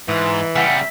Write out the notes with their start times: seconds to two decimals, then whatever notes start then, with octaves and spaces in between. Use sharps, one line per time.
0.08 G#2 E3
0.56 C#3 G3 E5 F#5